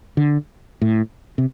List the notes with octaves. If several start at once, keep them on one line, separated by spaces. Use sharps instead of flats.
D3
A2
C3